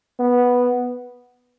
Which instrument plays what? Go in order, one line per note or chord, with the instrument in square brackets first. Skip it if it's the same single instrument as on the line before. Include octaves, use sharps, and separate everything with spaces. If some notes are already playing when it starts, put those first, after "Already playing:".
[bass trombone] B3